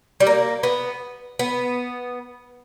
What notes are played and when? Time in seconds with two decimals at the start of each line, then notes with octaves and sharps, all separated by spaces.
0.20 G3
0.27 A#3
0.63 B3
1.39 B3